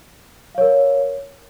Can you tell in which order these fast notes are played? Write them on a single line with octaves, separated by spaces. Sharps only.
F5 C#5 A#4